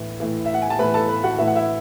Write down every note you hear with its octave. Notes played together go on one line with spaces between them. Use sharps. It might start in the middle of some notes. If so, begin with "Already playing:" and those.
Already playing: A2 E3
A2 E3
E5
F#5
G#5
A5
A2 E3 B4 B5
A4 A5
B4 B5
F#4 F#5
A2 E3 E5
F#5
E4 E5